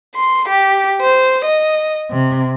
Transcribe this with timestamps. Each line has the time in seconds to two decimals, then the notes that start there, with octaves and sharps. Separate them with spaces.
0.16 C6
0.50 G4
1.02 C5
1.46 D#5
2.11 C3